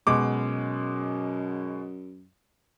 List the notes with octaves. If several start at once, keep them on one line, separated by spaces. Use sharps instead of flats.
F#2 B2 G#3 D6